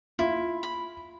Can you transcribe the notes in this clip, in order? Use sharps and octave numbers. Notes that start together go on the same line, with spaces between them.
E4 F4
B5